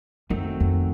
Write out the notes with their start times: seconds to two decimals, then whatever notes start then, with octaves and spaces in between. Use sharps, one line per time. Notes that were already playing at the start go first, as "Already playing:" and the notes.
0.30 F#2 D#3 F#3 A3 C4
0.60 F2